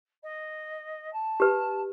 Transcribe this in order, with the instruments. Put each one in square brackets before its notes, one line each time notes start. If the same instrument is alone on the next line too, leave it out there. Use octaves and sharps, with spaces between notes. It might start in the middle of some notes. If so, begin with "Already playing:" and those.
[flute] D#5
A5
[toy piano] G4 B4